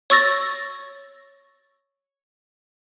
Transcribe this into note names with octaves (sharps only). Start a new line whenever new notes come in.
C#5 C#6 E6 A6 A#6